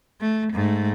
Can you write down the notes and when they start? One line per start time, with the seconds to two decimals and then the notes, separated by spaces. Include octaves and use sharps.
0.21 A3
0.52 G#2 A3